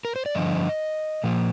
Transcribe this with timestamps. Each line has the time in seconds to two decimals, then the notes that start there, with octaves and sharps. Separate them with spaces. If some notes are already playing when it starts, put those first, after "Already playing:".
0.05 A#4
0.16 C5
0.26 D5
0.35 G2 D3 F3 D#5
1.24 A#2 F3 A#3